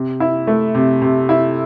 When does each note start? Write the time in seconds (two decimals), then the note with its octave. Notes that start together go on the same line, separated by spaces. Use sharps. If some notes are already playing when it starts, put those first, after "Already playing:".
Already playing: C3
0.20 E4
0.47 A3
0.75 C3
1.02 C3
1.29 E4